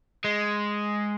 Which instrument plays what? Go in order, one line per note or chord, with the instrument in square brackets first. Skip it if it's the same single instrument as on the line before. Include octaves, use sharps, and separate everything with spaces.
[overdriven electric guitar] G#3